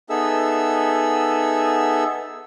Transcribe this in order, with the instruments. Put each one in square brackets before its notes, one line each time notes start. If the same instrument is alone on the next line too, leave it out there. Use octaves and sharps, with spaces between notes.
[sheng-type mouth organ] B3 D#4 G#4 A4 E5 E6